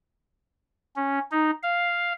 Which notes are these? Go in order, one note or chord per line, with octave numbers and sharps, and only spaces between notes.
C#4
D#4
F5